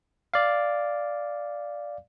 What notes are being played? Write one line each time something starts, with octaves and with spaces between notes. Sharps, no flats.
D5 F5